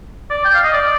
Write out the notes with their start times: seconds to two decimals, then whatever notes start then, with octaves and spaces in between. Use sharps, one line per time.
0.31 D5
0.45 G5
0.54 F5
0.64 D#5
0.74 D5